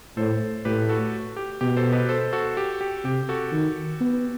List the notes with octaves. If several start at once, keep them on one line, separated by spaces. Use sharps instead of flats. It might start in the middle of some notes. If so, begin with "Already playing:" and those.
A2 A4 C5
A2 G4 B4
F#4 A4
G4
B2 G4
A4 C5
B4 D#5
A4 C5
F#4 A4
G4
G4
C3 G4
F#4 A4
D#3
B3